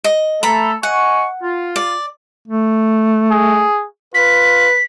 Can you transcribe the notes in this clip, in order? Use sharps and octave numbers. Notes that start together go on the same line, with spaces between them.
D#5
A3 A4 A#5 B5
D#5 F#5 G#5 C#6
F4
D5
A3
G#4
F4 B4 B6